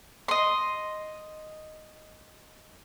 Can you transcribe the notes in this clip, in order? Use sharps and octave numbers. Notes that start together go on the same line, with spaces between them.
D#5 C6